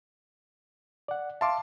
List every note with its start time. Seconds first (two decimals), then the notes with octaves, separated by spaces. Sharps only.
1.08 D5 F#5
1.41 E5 F5 A5 C6 D6